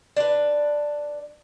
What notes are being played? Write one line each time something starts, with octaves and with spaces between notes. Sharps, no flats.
D4 B4